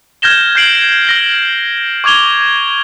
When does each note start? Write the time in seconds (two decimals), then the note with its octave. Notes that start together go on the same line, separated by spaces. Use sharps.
0.22 F6 G6 G#6 A#6 E7 G7
0.55 G6 G#6 C7 D7 F#7
1.07 F6 A#6 G7
2.04 C#6 D6 G#6 F7 G7